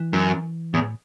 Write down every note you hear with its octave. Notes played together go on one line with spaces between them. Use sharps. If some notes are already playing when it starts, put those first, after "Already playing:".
Already playing: E3
F#2
E2 A2